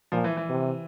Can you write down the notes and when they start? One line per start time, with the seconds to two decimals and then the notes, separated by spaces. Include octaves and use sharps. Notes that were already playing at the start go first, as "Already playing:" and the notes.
0.12 A#2 F3
0.24 E3
0.37 E3
0.49 C3